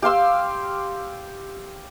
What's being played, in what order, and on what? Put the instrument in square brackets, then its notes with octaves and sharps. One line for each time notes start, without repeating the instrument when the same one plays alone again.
[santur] G4 F5 C6 E6